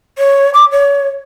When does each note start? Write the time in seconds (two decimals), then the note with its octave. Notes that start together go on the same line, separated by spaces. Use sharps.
0.18 C#5
0.54 D6
0.72 C#5